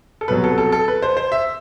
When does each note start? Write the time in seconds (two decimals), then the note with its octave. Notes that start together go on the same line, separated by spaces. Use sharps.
0.21 A4
0.28 C2 B2 F#3 B4
0.44 A4
0.58 A4
0.72 A4
0.88 B4
1.02 C5
1.17 C5
1.32 E5